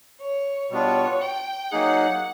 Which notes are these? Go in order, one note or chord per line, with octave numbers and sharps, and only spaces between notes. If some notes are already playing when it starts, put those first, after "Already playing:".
C#5
B2 G3 B3 D4 F4 C#5
G5
F#3 A#3 D#4 G#4 F#5